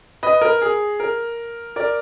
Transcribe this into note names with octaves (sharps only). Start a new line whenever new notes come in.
B4 D#5
A#4
G#4
A#4
A#4 D5